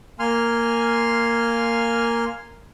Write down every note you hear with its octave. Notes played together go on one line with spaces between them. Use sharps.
A#3 G#5 C6 F6